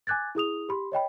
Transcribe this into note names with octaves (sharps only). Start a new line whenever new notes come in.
G#5 D6 F#6 G#6 A6
E4 G#4 D#6 F7
G4 B5 C6
C#5 D#5 G5 B5